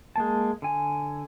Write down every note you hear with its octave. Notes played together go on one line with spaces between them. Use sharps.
G#3 A#3 A5
D3 G#5